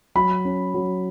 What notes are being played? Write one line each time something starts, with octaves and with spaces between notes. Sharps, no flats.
F#3 B5
C#4
F#3